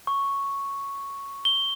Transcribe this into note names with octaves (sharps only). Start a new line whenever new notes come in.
C#6
G7